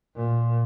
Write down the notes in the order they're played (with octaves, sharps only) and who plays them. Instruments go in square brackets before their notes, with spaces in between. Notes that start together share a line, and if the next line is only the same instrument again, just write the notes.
[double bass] A#2